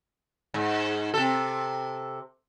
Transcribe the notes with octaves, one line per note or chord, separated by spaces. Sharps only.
G#2
C3 A4